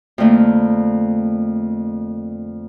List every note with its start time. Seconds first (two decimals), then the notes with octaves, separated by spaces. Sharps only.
0.18 F2 D3 A3 A#3